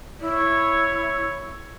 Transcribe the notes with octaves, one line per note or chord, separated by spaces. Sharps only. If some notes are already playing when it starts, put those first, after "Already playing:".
E4 C#5